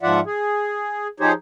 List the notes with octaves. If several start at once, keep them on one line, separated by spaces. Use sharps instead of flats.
G#2 F3 F4 D5 E5 F#5
G#4
F3 D#4 G4 G#4 C5 C#5